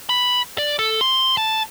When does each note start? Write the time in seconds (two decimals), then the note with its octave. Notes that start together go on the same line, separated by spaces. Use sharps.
0.09 B5
0.58 D5
0.79 A4
1.01 C6
1.37 A5